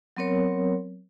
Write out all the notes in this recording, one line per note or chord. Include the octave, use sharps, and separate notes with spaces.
F#3 B3 C4 A#4 C#5